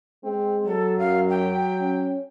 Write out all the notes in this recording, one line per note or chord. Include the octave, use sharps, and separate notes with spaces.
G#3 C4
F#3 A4
F#2 F5
G5
C#4